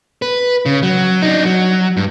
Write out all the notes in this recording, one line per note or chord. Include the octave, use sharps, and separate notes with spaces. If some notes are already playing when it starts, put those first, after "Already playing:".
B4
C#3
F#3
D4 D#4
F#3
G2